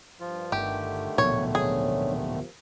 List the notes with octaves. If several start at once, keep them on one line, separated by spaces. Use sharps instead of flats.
G2 F3 F4
G1 D3 D#3 A3 G4
D1 A#1 B2 C#5
D4 G#4 C5 C#5
F3 G4 A#4